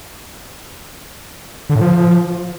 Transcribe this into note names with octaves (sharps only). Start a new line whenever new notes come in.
D3
A2
F3